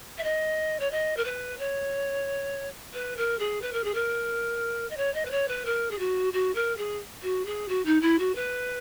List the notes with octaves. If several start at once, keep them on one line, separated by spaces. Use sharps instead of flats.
E5
D#5
C#5
D#5
A#4
B4
C#5
B4
A#4
G#4
B4
A#4
G#4
A#4
D#5
C#5
D#5
B4
C#5
B4
A#4
G#4
F#4
F#4
A#4
G#4
F#4
G#4
F#4
D#4
E4
F#4
B4